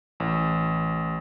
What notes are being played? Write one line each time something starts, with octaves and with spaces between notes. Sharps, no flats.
A1